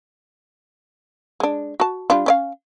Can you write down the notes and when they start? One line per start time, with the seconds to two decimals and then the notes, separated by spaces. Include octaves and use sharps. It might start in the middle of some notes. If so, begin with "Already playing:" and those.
1.40 G#3 D4
1.80 F#4 A5
2.10 G3 D4 F4
2.26 C#4 D5 F5